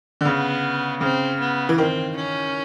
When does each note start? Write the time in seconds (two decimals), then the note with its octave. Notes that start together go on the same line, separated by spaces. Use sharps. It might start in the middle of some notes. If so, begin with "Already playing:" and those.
0.21 D3
0.25 C#3 B3
1.01 C#3 C4
1.40 B3
1.69 E3
1.77 D#3 C4
2.16 C#4